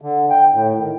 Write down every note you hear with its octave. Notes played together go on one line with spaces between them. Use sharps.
D3
G5
A2
D#3